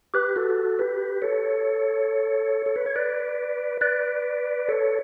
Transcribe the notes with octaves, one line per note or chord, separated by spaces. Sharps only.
G4 B4
F#4 A4
G4 B4
A4 C#5
A4
B4
C#5
B4 D5
B4 D5
A4 C#5